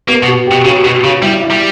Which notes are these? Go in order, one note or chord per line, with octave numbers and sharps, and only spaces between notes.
A#3 B3
B2
F#4
B2 G4
C#3 F#4
B2 F#4
C#3 F#4
G3 E4
E4
G3